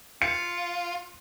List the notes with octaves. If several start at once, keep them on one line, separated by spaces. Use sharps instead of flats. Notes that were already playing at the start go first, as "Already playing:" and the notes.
F4 C#7